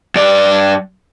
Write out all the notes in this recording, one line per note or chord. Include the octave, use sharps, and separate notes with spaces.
G2 D5